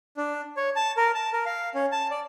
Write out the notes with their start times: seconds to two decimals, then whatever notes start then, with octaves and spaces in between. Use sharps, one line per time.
0.17 D4
0.57 C#5
0.76 A5
0.97 A#4
1.15 A5
1.33 A#4
1.46 F5
1.75 C#4
1.92 A5
2.11 D5